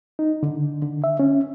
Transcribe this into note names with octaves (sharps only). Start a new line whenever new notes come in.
D#4
D3
D3
E5
C#4